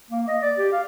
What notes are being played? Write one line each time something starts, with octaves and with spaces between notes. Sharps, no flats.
A#3
D#5
D5
G4
F5